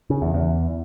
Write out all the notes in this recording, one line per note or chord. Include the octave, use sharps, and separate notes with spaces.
C#3
E2
E2